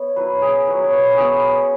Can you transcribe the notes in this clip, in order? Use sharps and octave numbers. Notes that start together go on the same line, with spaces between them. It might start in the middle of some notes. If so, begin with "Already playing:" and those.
Already playing: B3 C#5
F#3 E4 B4
G#4
F#3 E4 B4
C#5
B4
F#4
G#3 B3 E4 G#4